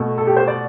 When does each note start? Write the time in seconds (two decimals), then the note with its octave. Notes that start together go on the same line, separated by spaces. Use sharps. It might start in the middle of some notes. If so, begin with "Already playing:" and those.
Already playing: B2 A3
0.18 A4
0.27 G4
0.37 C5
0.48 D5